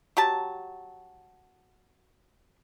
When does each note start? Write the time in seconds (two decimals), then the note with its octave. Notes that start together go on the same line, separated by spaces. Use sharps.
0.17 F#3 G4 A5